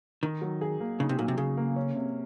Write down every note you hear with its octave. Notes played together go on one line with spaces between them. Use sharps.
D#3 D#4
F#3
G#4
A#3
C#3 D#4
C3
A#2 F#3
C3
C#3 G#4
A#3
C#4
C3